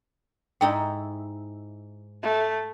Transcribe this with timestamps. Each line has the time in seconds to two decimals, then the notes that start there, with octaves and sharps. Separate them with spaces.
0.61 G#2 D#4 E4 G5
2.23 A3